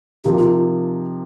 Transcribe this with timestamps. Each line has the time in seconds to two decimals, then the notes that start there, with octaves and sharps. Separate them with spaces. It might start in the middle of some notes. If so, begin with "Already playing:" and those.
0.24 C3 F3 A#3 D#4 G4
0.38 F4